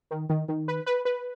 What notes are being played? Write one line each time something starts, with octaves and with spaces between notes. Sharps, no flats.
D#3
D#3
D#3
B4
B4
B4